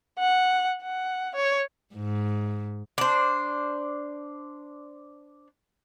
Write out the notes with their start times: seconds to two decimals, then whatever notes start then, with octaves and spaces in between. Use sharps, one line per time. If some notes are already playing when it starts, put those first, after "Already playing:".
0.19 F#5
0.82 F#5
1.35 C#5
1.94 G#2
2.98 D4 C5